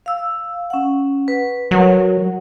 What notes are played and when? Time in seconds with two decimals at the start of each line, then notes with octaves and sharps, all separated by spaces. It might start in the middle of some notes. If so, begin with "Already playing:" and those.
0.06 F5 E6
0.70 C#4 F#5
1.28 B4
1.71 F#3 A#4 F#5